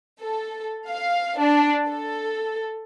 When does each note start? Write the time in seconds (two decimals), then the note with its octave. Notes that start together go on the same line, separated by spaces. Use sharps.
0.21 A4
0.87 F5
1.36 D4
1.87 A4